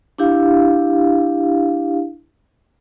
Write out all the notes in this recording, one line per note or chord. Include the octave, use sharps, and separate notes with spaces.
D4 E4 G4 F5